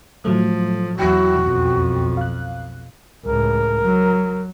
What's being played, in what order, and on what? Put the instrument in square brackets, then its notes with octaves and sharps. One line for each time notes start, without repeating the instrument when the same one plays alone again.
[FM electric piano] A2 F#3 A3 [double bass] F3
[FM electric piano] E2 G5 [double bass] F#3 E4 [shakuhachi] F#4
[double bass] B1 F2
[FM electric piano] F5 F#6
[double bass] C#2 A2 [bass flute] A#4
[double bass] F#3